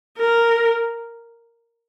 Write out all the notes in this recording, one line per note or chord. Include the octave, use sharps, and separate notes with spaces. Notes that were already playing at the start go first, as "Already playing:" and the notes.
A#4